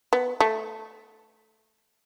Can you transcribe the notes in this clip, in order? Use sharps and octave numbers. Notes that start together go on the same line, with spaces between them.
B3
A3